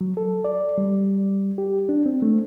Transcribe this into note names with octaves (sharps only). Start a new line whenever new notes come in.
F#3
A4
D5
G3
G4
D4
C4
A3